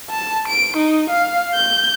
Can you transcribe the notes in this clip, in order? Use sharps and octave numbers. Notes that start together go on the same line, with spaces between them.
A5
D7
D#4
F5
G6